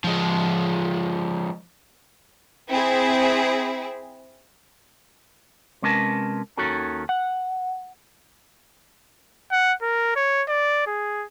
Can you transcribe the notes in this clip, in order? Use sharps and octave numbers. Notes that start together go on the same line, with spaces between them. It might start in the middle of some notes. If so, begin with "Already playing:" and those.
F3 G#3
C4 E4 G#4
C3 G#3 C#4 A#4 B4 A5
D#2 D#3 C#4 F#4 A4 A#4
F#5
F#5
A#4
C#5
D5
G#4